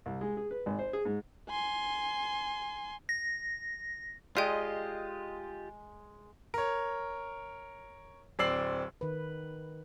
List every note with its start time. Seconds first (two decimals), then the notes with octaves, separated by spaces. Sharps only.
0.06 C2
0.21 G#3
0.37 G#4
0.51 B4
0.66 G#1
0.79 C5
0.93 G#4
1.05 G#2
1.49 G#5 C6
3.09 A#6
4.37 G#3 F4 G4 D5 D#5 G5
6.54 A#4 C#5
8.39 D1 C4 D5 E6 C7 F#7
9.01 D#3 B4